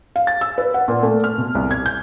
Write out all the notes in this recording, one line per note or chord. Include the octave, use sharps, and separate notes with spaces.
F5
A6
E6
B4
F#5
A#2
A3
F6
B2
C2
G#6
G6